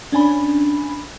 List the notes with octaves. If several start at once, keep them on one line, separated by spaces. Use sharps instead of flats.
C#4 D4 G#5 B5